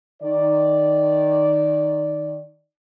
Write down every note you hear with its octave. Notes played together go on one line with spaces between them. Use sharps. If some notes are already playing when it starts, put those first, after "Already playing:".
D#3 D5